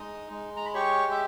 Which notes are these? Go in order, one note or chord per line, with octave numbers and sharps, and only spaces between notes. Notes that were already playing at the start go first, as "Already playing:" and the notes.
Already playing: G#3 D#4 D#5 D#6
G#3
A#5
B5
G4 C#5 C#6
E5